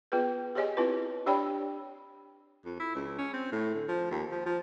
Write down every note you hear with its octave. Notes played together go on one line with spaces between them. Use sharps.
B3 F4 G#4 B4
G4 G#4 C#5 D#5 G#5
C4 E4 F4 B4
D4 G4 C#5 D5 G5 B5
F2
E4
C#2
C#4
C4
A2
D3
F3
D#2
F3
F3